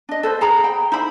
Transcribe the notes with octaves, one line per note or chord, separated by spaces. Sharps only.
D4 D#5
A4 B4 C5
G#4 A#5 B5
G5
D#4 E4 C5 B5